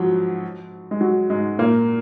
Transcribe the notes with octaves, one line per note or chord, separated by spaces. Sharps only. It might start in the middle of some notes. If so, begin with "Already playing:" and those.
Already playing: G#2 F3 F#3
G#3
F#3
G#2 G#3
A#2 A#3